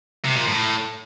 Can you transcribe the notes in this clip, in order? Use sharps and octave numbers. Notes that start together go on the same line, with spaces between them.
C3
A#2
A2